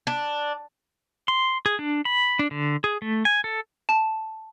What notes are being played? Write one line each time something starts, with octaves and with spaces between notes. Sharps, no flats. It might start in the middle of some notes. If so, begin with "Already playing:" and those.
D4
C6
G#4
D4
B5
D4
D3
G#4
A3
G#5
A4
A5